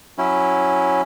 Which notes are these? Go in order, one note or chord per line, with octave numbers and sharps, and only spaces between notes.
F#3 C#4 E4